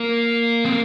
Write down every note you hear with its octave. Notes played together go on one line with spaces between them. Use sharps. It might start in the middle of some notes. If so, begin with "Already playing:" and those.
Already playing: A#3
C4